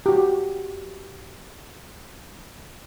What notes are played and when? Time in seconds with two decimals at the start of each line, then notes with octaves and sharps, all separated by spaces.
0.06 F#4 G4